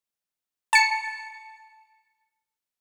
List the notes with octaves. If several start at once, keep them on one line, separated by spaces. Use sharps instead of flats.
A5 C#7